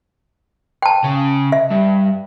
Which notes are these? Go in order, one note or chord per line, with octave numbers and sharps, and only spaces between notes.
G5 A5
C#3
E5
G2